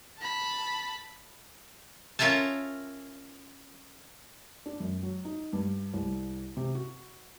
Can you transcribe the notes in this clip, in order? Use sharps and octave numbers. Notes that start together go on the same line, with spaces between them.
A5 B5
C#4 F4 A#4 E5 G#5 A5
D4
F#2
F#3
D#4
G2
C2
C3
F#4